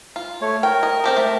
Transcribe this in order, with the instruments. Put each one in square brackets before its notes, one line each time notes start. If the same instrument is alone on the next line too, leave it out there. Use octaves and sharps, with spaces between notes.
[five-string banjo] F4
[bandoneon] A3 C#5
[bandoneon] A#4 [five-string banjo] G5
[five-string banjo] D#5
C4 G4 A4
A3